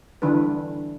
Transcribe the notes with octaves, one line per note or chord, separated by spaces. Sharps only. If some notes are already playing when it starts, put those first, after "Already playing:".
D3 E3 G3 D4 B4